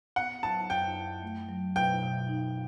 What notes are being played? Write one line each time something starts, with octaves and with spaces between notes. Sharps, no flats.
B3 F#5
F#3 A5
F#2 G5
E4
A3
F#3
B2 G5
B2
D#4